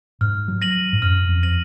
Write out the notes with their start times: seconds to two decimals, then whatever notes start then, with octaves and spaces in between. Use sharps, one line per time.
0.21 G#2 F6
0.48 F#3
0.62 A#6 D#7 F#7
0.93 G#2
1.02 F#2 F6
1.29 F2
1.43 A#6 D#7 F#7